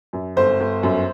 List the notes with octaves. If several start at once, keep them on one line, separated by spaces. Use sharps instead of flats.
F#2
G1 C5
G1
F#2